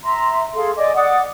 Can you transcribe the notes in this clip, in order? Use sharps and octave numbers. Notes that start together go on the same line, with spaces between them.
E5 A#5 C6
G#4 A4 F5 C6
D5 D#5 G#5 D6
D5 F#5 D6 D#6